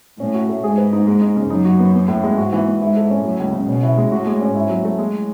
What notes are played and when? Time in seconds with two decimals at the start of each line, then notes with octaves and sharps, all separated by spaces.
0.20 A2 C#4
0.34 F#4
0.49 A3
0.63 G#2 G#4
0.78 B4
0.93 D#4
1.07 G#3
1.21 D#4
1.36 C#3
1.50 F#2 D#4
1.65 F#4
1.79 B3
1.94 B3
2.08 A2
2.24 G#3
2.37 G#2 F#4
2.53 E3
2.66 B3
2.81 G#2 E4
2.96 A4
3.10 C#4
3.24 A2 F#3
3.39 C#2
3.53 C#3
3.68 B2 C#4
3.83 E4
3.97 G#3
4.12 A2 F#4
4.27 G#3
4.41 C#4
4.55 G#2 E4
4.69 F#3
4.85 A3
4.99 A2 G#3